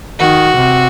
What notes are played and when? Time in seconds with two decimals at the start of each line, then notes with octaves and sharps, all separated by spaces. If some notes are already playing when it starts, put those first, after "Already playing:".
0.19 D#3 F#4
0.56 C3